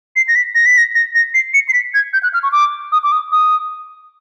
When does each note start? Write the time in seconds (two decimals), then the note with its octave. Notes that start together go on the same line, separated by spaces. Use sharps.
0.16 C7
0.28 A#6
0.35 B6
0.55 A#6
0.66 B6
0.78 A#6
0.95 A#6
1.15 A#6
1.34 C7
1.54 C#7
1.69 C7
1.73 B6
1.94 G#6
2.13 G6
2.23 F#6
2.34 F6
2.43 C#6
2.52 D6
2.92 D#6
3.03 D6
3.12 D#6
3.32 D#6